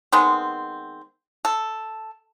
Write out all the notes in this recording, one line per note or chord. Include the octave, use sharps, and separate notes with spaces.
D#3 G#3 B3 C4
A4